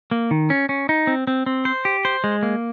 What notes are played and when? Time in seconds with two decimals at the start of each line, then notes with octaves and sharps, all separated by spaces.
0.11 A#3
0.31 D#3
0.50 C#4
0.69 C#4
0.89 D#4
1.07 C4
1.27 C4
1.46 C4
1.65 C5
1.85 G4
2.05 C5
2.24 G#3
2.43 A#3